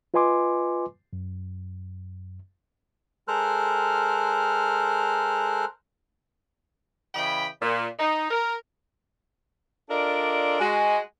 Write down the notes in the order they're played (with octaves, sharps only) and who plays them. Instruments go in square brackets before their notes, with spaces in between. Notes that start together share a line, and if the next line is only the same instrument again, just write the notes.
[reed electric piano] F4 B4 D#5 G#5 C6 D6
F#2
[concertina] G#3 A4 A#4 C5 F6 F#6
[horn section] C#3 E3 D#5 G5 B5
A#2
D#4
A#4
[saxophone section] D4 F4 A4 A#4 D5 D#5
G#3 F#4